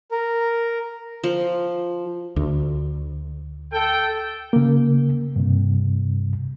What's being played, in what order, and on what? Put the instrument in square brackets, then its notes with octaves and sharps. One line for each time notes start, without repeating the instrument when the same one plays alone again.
[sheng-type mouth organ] A#4
[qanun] F3
[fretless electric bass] D2
[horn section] A4 G5
[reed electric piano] C#3 A#3
G2 C3